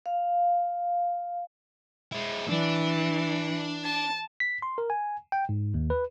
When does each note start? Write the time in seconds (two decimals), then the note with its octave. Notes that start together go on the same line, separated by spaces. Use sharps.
0.06 F5
2.12 G#3 E4
2.49 E3 D4
3.85 A5
4.40 B6
4.62 C6
4.78 A#4
4.90 G#5
5.32 G5
5.49 G#2
5.74 D#2
5.90 B4